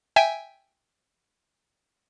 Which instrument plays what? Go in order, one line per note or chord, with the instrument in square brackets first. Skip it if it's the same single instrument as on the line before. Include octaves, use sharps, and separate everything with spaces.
[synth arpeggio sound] E5 G5 G#5